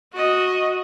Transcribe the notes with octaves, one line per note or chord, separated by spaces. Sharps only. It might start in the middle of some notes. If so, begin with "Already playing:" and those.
F#4 D#5